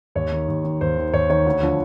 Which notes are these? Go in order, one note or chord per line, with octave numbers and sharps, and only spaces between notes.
D#2 C#5
D#3
D#2
D#3
D#2 C5
D#3
D#2 C#5
D#3 C#5
D2
D3 F3